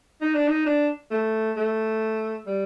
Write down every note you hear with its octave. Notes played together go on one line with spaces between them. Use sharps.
D#4
D4
D#4
D4
A3
A3
G3